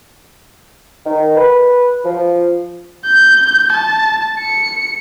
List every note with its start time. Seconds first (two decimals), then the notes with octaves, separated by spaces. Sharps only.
1.05 D#3
1.36 B4
2.04 F3
3.05 G6
3.73 A5
4.39 C#7